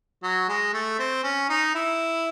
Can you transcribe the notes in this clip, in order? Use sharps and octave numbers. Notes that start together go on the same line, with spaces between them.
F#3
G#3
A3
C4
C#4
D#4
E4